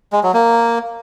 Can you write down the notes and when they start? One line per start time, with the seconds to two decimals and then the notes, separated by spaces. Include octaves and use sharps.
0.13 G#3
0.23 F#3
0.34 A#3